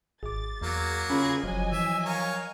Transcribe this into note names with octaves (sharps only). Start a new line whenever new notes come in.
G#1 G#4 D6 A6
E2 F#3 A#3
C#3 C#4 F4 G#4 B5 G#6
F#1 F3 F#3 D#5 G#5
E3 E5
A#4 C#5 F5